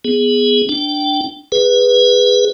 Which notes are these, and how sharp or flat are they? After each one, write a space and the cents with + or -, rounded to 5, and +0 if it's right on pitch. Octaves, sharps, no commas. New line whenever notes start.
B3 +0 G#4 +0
D4 +0 G5 -15
G#4 -15 B4 +0